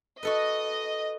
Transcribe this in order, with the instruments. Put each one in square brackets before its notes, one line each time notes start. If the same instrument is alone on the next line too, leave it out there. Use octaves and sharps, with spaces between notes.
[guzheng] F#4 A4 B4 [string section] D#5